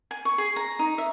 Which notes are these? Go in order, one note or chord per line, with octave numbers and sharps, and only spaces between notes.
G#5
C#6
G#4
A#5
D#4
E5